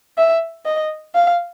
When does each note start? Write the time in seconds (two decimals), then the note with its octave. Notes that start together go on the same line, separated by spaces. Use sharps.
0.18 E5
0.66 D#5
1.15 F5